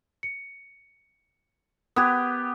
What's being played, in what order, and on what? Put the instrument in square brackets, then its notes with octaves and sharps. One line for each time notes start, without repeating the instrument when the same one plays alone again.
[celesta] C#7
[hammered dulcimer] B3 G4 [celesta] D#6 F#6 G#6